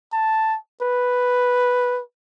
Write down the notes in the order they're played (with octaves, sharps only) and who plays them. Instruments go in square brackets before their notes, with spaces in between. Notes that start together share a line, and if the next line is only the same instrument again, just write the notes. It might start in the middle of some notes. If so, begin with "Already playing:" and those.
[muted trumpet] A5
B4